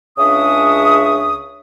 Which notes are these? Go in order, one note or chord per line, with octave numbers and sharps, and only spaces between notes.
C#2 C#3 D4 E5 C#6 D#6